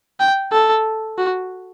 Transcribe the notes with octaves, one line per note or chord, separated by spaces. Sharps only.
G5
A4
F#4